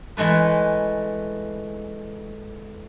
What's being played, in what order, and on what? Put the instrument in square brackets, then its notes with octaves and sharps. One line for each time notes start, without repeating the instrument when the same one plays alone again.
[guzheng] E3 G#3 A3 B4